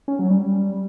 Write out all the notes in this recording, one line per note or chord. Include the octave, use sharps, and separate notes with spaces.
C#4
F#3
G3